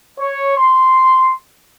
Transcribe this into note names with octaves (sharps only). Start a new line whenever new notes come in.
C#5
C6